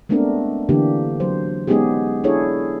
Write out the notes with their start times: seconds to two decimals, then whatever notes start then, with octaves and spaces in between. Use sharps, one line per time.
0.09 G#3 A3 B3 C4 D4 A#4
0.69 D3 E3 A#3 D4 G4
1.20 F#3 C5
1.67 G#3 B3 C#4 D#4 G4 G#4
2.24 D4 E4 G#4 A4 C#5